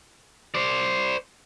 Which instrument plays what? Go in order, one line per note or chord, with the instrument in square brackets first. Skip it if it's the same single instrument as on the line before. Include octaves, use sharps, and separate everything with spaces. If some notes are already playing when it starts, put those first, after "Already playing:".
[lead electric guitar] C5 D5